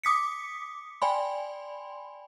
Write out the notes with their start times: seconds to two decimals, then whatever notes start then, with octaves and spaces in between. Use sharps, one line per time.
0.04 D6 D#6 B6 C#7
1.02 D5 G5 G#5 B5 C6